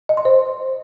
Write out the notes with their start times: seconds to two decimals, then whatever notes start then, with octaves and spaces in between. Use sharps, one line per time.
0.09 D#5
0.17 C6
0.25 C5